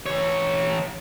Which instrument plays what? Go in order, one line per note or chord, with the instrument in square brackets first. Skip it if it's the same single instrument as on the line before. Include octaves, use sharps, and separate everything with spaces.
[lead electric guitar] E3 C#5